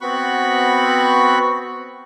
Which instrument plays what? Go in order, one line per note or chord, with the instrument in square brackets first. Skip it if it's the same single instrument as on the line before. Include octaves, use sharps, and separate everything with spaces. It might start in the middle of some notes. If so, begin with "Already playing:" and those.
[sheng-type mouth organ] B3 C4 F#4 B5 C#6 F#6